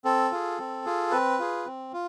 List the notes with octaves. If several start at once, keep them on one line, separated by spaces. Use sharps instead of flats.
C4 A4
F4 G#4
C4
F4 G#4
C4 B4
F4 G#4
C4
F4